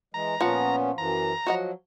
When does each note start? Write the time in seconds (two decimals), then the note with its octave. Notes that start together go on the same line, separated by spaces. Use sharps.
0.14 E3 G#3 A#5
0.41 A#2 F3 B3 C#4 F#5
0.98 F#2 E3 A#5
1.47 F3 F#3 F#4 D#5 F#5